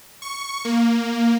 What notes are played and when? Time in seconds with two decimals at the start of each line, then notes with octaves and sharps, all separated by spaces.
0.22 C#6
0.65 A#3